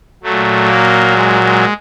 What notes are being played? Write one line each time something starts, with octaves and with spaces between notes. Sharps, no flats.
A#2 F#3 A3
A#3
G#3
G#3